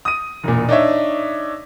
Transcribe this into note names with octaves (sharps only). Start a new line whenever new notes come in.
D#6 D#7
E1 A#2
D4 D#4 C#5 E5